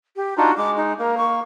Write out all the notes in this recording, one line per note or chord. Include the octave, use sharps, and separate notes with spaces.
G4
D4 D#4 F4 F#4
G#3 D6
D#4
A#3 A#4
C#6